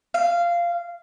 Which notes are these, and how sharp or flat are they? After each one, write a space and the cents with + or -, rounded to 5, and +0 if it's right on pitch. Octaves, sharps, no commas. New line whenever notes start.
F5 -15